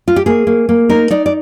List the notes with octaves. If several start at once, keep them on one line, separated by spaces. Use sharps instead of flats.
F4
G4
A#3 G#4
A#3
A#3
D#4 A#4
D#4 D5
D5